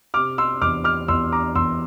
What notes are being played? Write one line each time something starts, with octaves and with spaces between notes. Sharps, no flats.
C3 D6 F6
C6 E6
E2 D6 F6
D6 F6
E2 C6 E6
A#5 D6
E2 C6 E6